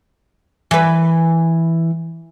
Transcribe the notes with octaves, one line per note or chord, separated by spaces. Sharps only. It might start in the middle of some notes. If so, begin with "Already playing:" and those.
E3 B4